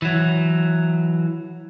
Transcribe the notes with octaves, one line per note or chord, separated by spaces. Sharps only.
E3 F#3